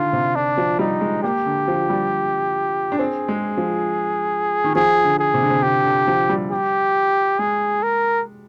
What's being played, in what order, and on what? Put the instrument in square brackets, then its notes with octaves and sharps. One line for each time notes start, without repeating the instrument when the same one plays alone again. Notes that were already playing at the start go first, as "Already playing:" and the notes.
Already playing: [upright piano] D3 D#3 [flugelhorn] F4
[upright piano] C3
[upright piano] D3 [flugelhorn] D4
[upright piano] F3
[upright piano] G3 [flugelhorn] D#4
[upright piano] G#3
[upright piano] A#3 [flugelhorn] G4
[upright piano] D3
F3
G3
D4
[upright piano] C4 [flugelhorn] G#4
[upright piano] G#3
F3
D#3
[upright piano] F3 [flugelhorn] G#4
[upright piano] D3
[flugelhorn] G#4
[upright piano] C3
D3
C3
[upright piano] D3 [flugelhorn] G4
[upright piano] D3
F3
G3
[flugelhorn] G4
[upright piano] G#3 [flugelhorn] G#4
[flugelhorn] A#4